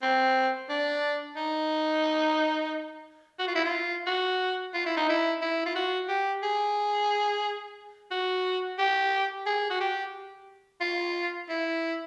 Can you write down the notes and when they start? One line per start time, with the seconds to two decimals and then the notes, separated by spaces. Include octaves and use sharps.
0.02 C4
0.69 D4
1.36 D#4
3.39 F#4
3.47 F4
3.55 E4
3.65 F4
4.07 F#4
4.74 F4
4.86 E4
4.97 D#4
5.09 E4
5.42 E4
5.66 F4
5.75 F#4
6.08 G4
6.43 G#4
8.11 F#4
8.78 G4
9.46 G#4
9.70 F#4
9.80 G4
10.81 F4
11.49 E4